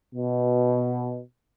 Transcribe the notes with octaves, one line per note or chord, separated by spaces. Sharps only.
B2